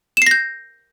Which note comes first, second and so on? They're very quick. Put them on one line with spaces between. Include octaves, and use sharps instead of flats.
E7 C7 A#6 G6